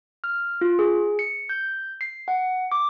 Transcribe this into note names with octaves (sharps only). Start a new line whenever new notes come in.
F6
F4
G#4
C#7
G6
C7
F#5
D6